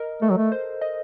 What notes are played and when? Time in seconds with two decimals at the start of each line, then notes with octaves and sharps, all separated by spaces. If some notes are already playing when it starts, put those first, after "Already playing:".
Already playing: A#4 D#5
0.22 A3 A4
0.30 F#3
0.37 A3
0.52 C5
0.82 D#5